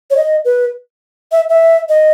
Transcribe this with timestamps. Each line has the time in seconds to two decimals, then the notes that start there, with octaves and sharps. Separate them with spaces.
0.10 C#5
0.17 D#5
0.45 B4
1.32 E5
1.49 E5
1.89 D#5